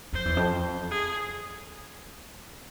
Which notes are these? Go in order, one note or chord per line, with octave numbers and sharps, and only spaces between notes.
F2 C5
E2
F2
G#4